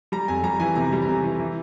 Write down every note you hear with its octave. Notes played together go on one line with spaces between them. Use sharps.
G3 A#5
F2 G#5
G3 A#5
E3 G#5
C3 A#5
G3
A#5
C3 G#5
E3
E3